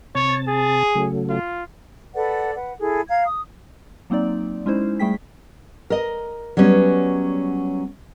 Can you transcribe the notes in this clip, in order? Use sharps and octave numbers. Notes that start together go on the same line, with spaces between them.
C3 C#5 A5
G#4
C#3 F#3 A3
F4
A4 B4 D5 F#5
B4 F#5
E4 G#4 A4
F5 A#5 G#6
D#6
F#3 A#3 C4 D#4 D5
G#3 C#4 D#4 E4 C5
G3 A3 G#4 G5 B6
A#4 D#5
F#3 G3 B3 C#4